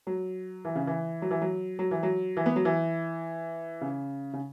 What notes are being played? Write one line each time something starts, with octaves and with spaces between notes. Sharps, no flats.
F#3
E3
C#3
E3
F#3
E3
F#3
F#3
E3
F#3
E3
B3
F#3
E3
C#3
C#3